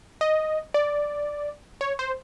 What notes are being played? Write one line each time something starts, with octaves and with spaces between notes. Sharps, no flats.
D#5
D5
C#5
C5